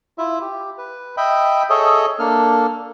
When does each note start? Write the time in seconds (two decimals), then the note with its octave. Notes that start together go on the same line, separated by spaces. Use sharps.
0.18 E4 F4 E5
0.41 G4
0.78 B4
1.17 D#5 E5 G5 B5
1.70 G#4 A4 C#5 D#5 E5
2.19 A#3 D4 A4 F6